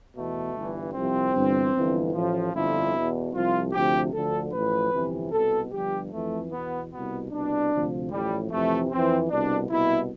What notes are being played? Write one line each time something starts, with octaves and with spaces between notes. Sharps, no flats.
E2 B2 A3
G1 G2 E3
C2 C3 F3 C4
G1 G2 E3
G1 F2 E3
A1 A2 F3
G1 F2 D3 F3 E4
E2 B2
C2 C3 F3 F4
D2 C3 F3 G4
D2 D3 F3 A4
A1 A2 F3 B4
G1 F2 C3 E3
C2 B2 A4
G1 G2 F3 G4
F2 E3 A3
E2 B2 B3
C2 B2 B3
C2 B2 D4
D2 C3 F3
A1 A2 F3 G3
F2 C3 E3 A3
F2 E3 C4
C2 B2 D4
C2 B2 E4